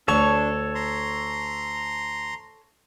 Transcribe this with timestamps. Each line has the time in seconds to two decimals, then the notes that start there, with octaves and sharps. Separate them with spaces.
0.08 D2 D4 A4 C#5 C#6
0.75 A#5 C6